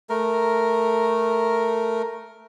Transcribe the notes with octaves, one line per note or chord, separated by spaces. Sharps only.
A3 A#4